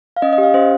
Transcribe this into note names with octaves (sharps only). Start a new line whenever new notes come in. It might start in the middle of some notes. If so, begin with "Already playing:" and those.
F5
C#4 D#5
D#5
G4 F5
C#4 C5